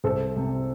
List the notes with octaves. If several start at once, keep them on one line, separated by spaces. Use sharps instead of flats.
C2 A4 C5
C3